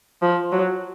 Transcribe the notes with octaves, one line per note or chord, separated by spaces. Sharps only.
F3
F#3